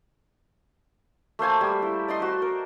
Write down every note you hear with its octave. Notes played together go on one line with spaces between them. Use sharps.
A3 A#3 C5 G#5
G3
E4
D5 D#5 C6
F#4 C5
A#4